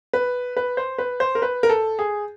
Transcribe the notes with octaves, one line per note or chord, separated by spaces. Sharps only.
B4
B4
C5
B4
C5
A#4
B4
A#4
A4
G#4